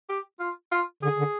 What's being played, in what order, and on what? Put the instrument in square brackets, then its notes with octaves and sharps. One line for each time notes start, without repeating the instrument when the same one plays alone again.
[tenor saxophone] G4
F4
F4
[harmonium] D3 [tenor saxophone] G#4
[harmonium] D3